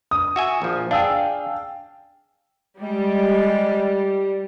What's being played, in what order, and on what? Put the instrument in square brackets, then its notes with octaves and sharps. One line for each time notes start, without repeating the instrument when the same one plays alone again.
[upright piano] D#6
[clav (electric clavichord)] F#4 E5 G#5
A#1 F3
[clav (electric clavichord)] D4 G#4 [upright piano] F5 G5 E6
[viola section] G3 [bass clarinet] G#3